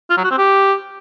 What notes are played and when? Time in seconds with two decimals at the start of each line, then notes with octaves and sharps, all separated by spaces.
0.10 F4
0.17 F#3
0.24 F#4
0.31 C4
0.38 G4